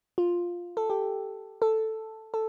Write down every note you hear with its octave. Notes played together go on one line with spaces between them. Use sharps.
F4
A4
G4
A4
A4